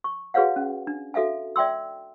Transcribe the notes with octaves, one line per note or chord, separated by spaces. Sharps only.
C#6
F#4 G#4 B4 C#5 F5 F#5
C#4
D4
F#4 A4 E5 F5 G#5
D5 E5 G5 C6 E6